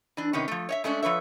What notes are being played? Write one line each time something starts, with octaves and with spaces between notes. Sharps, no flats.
E3 D4
C3 D#3 B3 C#4
F3 A3
C#5 D#5 E5
G#3 A3 C#4 D4
F3 B4 C#5 E5